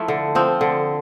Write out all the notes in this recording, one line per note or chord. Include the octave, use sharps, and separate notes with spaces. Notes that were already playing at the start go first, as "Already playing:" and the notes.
Already playing: F3 A3 E4
D3
F3 C4
D3